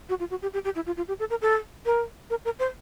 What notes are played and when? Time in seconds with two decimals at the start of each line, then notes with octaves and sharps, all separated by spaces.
0.09 F#4
0.20 F4
0.30 F#4
0.42 G4
0.54 G4
0.65 G4
0.75 E4
0.87 F4
0.97 F4
1.08 G4
1.19 A4
1.30 A#4
1.42 A4
1.86 A#4
2.30 A#4
2.45 A#4
2.59 C5